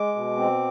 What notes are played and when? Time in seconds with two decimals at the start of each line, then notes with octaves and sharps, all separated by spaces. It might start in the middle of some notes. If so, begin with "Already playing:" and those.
Already playing: G#3 D6
0.15 B2
0.37 C4